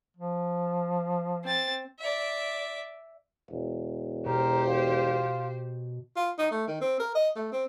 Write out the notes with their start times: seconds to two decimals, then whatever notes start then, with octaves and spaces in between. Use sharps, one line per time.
0.17 F3
1.44 C4 A6
2.00 D5 E5
3.50 E1
4.26 B2 G4 A#4 C5
4.68 F4
6.16 F4
6.38 D#4
6.51 A3
6.68 D#3
6.81 C4
7.00 A#4
7.15 D#5
7.36 A3
7.52 C4